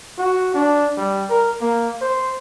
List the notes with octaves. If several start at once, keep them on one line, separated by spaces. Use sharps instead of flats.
F#4
D4
G3
A#4
A#3
C5